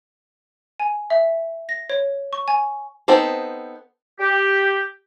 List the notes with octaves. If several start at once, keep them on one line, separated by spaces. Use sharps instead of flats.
G#5
E5
A#6
C#5
C#6
G#5
B3 C4 D#4 A4 C5
G4